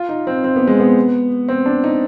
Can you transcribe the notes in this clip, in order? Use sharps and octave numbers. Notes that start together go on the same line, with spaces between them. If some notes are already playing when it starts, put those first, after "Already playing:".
Already playing: F4
D#4
C4
C4
B3
G#3
B3
C4
D4
D#4